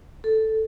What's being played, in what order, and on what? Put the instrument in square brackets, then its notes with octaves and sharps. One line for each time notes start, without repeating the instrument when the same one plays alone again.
[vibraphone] A4